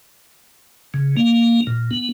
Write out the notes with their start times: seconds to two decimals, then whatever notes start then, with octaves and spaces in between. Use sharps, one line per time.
0.94 C#3
1.17 A#3
1.67 A#2
1.91 B3